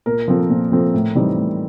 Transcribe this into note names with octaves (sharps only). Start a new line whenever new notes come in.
A#2 A#4
F3 A3 C4
A#2
F3 A3 C4
A2
E3 G3 C4 D#4
A2